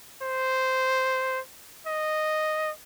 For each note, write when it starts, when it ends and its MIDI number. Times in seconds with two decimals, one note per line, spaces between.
0.22 1.40 72
1.87 2.71 75